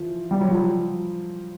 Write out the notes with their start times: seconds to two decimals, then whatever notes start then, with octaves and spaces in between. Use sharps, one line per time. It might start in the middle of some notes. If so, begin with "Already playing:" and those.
Already playing: E3 F3
0.31 G3
0.41 F#3
0.51 F3